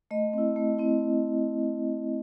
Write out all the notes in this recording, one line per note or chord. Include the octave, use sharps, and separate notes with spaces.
A3 D#5
C4 E4
A3
C4 E4